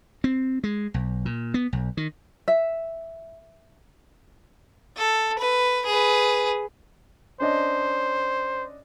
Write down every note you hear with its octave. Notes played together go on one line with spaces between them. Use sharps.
C4
G#3
B1
A#2
B3
B1
D#3
E5
A4
B4
G#4 B4
C#4 D4 C5 D#5